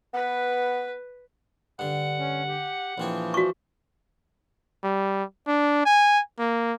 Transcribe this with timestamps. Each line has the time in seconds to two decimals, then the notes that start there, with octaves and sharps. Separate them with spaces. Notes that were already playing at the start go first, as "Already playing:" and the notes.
0.14 B3 B4
1.79 G2 D3 F#5
2.19 C#4
2.48 G4
2.98 A#1 E3 F3 C4 C#5
3.34 F#4 C#6
4.84 G3
5.48 D4
5.86 G#5
6.39 A#3